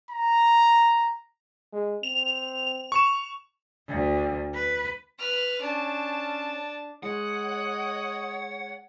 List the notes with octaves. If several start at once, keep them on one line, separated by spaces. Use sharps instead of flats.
A#5
G#3
C4 F7
C#6 E7
D2
B4
B4 F6
C#4 D4 A5
G#3 C#5 D#5 F#5